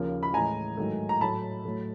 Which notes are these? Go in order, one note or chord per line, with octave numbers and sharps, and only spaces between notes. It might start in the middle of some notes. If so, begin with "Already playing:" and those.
Already playing: D#2 C#3 F3 A#3
B5
A2 E3 G#3 G#5 A#5
G#2 D#3 F#3 A3
A#5
A2 F#3 A3 A5 B5
A2 F#3 A3